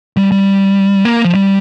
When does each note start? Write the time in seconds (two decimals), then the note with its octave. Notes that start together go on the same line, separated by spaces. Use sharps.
0.17 G3
0.32 G3
1.05 A#3
1.24 F3
1.34 G3